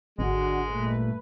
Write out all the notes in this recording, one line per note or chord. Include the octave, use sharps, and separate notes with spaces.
G#1 D3 G#3 F#4
G2 A#2 A3 B4